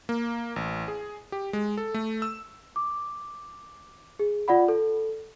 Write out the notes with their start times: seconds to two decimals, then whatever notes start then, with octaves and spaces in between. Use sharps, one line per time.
0.09 A#3
0.56 A1
0.88 G#4
1.32 G4
1.53 G#3
1.77 A4
1.94 A3
2.22 E6
2.76 D6
4.19 G#4
4.48 F4 D5 F#5 B5
4.68 A4